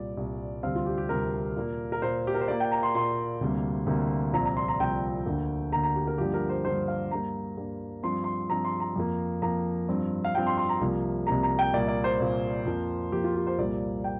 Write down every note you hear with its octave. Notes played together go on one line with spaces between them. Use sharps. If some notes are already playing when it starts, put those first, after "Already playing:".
Already playing: C2 A#2 G3 D5
C2 A#2 G3
D2 C3 G3 C4 F5
F4
G4
G4
D2 C3 G3 C4 A#4
A#2 A#3
A#4
A#2 A#3 C5
G4
A#4
C5
A#2 A#3 D5
G5
A#5
C6
A#2 A#3 C6
D2 C3 G3 A#3
D2 C3 G3 A#3
C2 A#2 F3 C4 A#5
A#5
C6
A#5
C2 A#2 F3 C4 G5
D2 D3 A#3
D2 D3 A#3 A#5
A#5
G4
A#4
G2 D3 F3 A#3 G4
A#4
C5
G2 D3 F3 A#3 C5
F5
G2 G3 A#3 A#5
G2 G3 A#3
G2 F3 C4 C6
C6
G2 F3 C4 A#5
C6
A#5
F2 F3 A#3
F2 F3 A#3 A#5
G2 F3 C4
F5
G2 F3 C4 G5
C6
C6
A#5
C2 C3 F3 A#3
C2 C3 F3 A#3 A#5
A#5
G5
C2 A#2 A#3 D5
D5
C5
C2 A#2 A#3
F2 F3 A#3
F2 F3 A#3 G4
F4
G4
C5
C2 A#2 G3 A#3 D5
G5